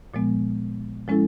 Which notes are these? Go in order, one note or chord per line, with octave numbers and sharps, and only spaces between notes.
A#2 F3 G#3 B3
F3 G#3 C#4 E4 A4